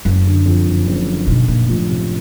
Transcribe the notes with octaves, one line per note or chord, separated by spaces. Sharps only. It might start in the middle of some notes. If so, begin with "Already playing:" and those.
F#1 F#2
D3
F2
F#1
F#1
D3
B2 D#4
A#2 A#3
A2 F3
C3